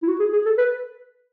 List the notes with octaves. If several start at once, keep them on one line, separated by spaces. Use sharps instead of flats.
E4
F#4
G#4
G#4
A4
B4